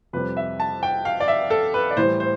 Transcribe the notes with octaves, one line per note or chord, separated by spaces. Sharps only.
F2 C3 G3 B4
E5
A5
G5
F5
D5
E5
A4
B4
D5
A2 E3 G3 C5
C5